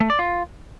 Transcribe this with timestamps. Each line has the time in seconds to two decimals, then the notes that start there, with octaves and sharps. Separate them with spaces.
0.01 A3
0.10 D5
0.19 F4